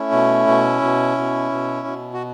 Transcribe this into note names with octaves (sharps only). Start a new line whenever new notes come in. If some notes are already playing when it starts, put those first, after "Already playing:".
Already playing: A3 C#4 E4
B2
B2
B2
B2
B2
B2
F#4